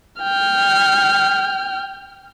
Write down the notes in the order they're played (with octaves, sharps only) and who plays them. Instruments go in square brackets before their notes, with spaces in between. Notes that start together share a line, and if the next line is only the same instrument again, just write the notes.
[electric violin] G5 F6